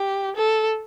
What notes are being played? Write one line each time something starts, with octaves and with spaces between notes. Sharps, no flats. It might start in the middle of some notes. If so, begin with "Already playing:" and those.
Already playing: G4
A4